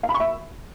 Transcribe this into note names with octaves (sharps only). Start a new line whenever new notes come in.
F5
B5
C#6
E5